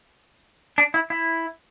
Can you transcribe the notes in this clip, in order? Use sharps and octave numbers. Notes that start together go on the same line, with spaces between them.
D4
E4
E4